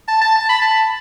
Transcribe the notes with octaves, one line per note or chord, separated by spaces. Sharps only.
A5
A5
A5
B5
A5